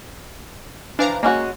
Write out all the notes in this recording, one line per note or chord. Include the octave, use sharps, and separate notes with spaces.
E3 F3 D4 F5 A#5
G#3 A#3 C#4 F#4